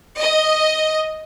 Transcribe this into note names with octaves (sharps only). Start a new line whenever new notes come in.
D#5